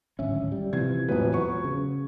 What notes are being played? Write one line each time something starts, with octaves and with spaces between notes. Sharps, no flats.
D1 G#1 C#4 E5
G3
C3 E3 F3 G#6
E1 F2 A2 F#3 B4
F#3 C#6
C#3